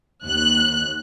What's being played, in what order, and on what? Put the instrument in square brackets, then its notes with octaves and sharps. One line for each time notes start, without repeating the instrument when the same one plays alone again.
[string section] D#2 F#6